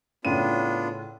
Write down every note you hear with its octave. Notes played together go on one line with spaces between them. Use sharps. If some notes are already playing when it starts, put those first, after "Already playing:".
A2 C#3 B3 D4 F4 D#7